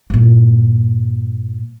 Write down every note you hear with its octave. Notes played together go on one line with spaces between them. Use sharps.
G2 A#2